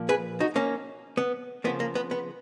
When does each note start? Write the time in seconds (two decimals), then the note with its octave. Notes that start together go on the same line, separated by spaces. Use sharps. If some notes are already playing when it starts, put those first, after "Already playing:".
Already playing: A#2 F3 A#3
0.09 G#4 B4
0.40 D#4 F#4
0.56 A#3 C#4
1.17 B3
1.64 C#3 F3 A#3 B3
1.80 A#3
1.95 B3
2.11 B3